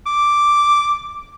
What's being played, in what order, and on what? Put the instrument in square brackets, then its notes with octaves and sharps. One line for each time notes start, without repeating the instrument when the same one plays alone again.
[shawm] D6